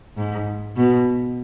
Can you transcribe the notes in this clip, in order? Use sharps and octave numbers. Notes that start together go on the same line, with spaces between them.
G#2
B2